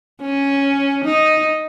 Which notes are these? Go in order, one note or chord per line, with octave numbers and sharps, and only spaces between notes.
C#4
D#4